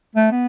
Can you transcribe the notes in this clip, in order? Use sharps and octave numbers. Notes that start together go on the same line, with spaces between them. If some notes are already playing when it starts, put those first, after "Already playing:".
A3
B3